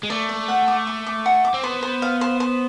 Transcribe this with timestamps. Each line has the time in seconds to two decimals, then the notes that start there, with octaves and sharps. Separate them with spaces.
0.03 G#3
0.10 A3 D5
0.29 D5
0.48 F#5
0.68 D6
0.87 D6
1.06 D6
1.26 F#5
1.45 D6
1.54 C4
1.63 B3 C5
1.83 C5
2.02 F5
2.21 C5
2.40 C5